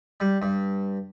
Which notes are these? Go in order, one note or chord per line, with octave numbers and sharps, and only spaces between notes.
G3
G2